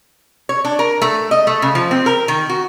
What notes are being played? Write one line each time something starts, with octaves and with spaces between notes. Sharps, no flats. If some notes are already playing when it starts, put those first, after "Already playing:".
C#5
D4
A#4
A3
D#5
A3
C#3
F3
C4
A#4
D#3
F#4